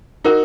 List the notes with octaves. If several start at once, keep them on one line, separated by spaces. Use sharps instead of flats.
D#4 F#4 A#4